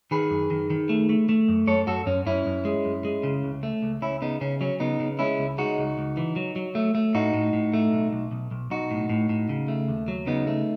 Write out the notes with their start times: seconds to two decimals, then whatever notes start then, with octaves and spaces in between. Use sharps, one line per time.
0.11 D#3 G#4 B4
0.30 F#2
0.51 D#3
0.70 D#3
0.89 A3
1.09 A3
1.29 A3
1.48 F#2
1.67 F#2 A4 C#5
1.87 F#2 F#4 A4
2.06 F#2 C#4
2.26 F#2 C#4 E4
2.46 F#2
2.65 G#3
2.85 F#2
3.05 G#3
3.23 C#3
3.43 C#2
3.63 A3
3.82 C#2
4.01 C#2 C#4 E4
4.22 C#3 B3 D#4
4.41 C#3 C#4
4.61 F#3 C#4
4.80 C#3 B3 D#4
5.00 C#3
5.19 G#3 C#4 E4
5.39 C#2
5.58 G#3 D#4 F#4
5.78 C#2
5.98 C#2
6.17 E3
6.36 F#3
6.56 F#3
6.75 A3
6.95 A3
7.15 A2 D#4 F#4
7.34 A2
7.53 A2
7.74 A3
7.93 B1
8.13 B1
8.31 B1
8.51 B1
8.70 B1 D#4 F#4
8.91 A2
9.09 A2
9.29 A2
9.49 C#3
9.68 A3
9.89 D#2
10.08 F#3
10.27 C#3 B3 D#4
10.47 A3